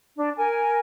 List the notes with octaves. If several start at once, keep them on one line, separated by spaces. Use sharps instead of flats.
D4
A#4 G#5